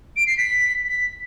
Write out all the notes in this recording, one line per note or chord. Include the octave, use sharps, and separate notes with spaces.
D7
C7
B6
B6